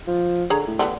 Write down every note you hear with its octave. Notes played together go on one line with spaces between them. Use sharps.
F3
D3 G#4 C#5 A#5
A2
D3 G3 B3